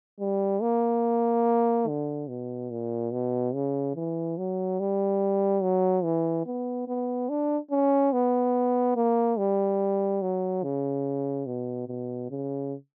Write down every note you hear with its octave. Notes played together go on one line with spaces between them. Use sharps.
G3
A#3
D3
B2
A#2
B2
C#3
E3
F#3
G3
F#3
E3
B3
B3
D4
C#4
B3
A#3
G3
F#3
C#3
B2
B2
C#3